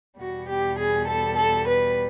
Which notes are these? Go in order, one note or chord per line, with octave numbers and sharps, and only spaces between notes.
E2 B2 G3 F#4
G4
G#4
A4
A4
B4